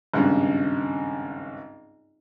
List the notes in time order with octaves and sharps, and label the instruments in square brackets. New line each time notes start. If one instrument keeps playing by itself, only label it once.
[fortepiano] G#1 C#2 G2